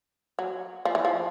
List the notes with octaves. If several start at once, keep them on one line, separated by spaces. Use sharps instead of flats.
F#3
F3
E3
F3